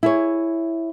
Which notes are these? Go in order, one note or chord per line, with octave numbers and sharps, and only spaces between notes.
E4 G#4 C#5